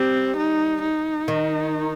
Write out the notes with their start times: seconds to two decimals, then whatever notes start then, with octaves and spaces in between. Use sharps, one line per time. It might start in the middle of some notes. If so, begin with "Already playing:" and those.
Already playing: G3 C4
0.37 D#4
0.82 D#4
1.28 D#3